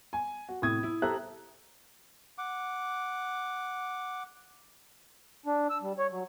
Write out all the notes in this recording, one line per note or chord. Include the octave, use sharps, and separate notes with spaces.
G#5
F#4
A2 C3 E4 D#6 G#6
E4
G4 A4 C5 E5 A#5 F#6
F#5 D6
D4
E6
G3
C#5
F#3